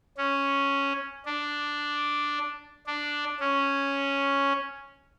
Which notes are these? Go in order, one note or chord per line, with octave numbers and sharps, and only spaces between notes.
C#4
D4
D4
C#4